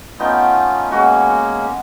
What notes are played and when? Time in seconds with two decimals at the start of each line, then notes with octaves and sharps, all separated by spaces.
0.19 A3 B3 C#4 D#4 F4 G5
0.92 G#3 A#3 C#4 F#4